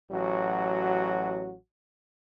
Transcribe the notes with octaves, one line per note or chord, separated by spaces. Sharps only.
A1 F#3 F#4